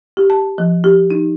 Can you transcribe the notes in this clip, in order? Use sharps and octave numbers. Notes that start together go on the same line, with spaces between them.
G4
A5
F3
G4
D#4